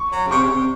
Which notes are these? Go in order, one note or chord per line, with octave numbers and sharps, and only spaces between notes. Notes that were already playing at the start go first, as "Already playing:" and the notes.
Already playing: C#6
F#3
C#3
C3 C#6
C#3
C3